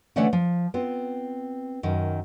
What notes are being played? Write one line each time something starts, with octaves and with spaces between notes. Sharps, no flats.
D3 E3 A3 C#4 D5 F#5
F3
B3 C4 F4
F#2 D#3